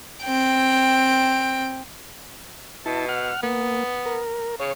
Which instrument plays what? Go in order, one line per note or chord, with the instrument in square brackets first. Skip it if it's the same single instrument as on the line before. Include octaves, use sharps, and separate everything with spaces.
[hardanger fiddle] C4 G5
[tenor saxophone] B2 [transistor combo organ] E4 A5
[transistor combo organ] F#5 F6
[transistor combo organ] A#3 [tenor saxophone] B3
[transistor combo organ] A#4
[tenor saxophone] C#3 [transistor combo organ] C#5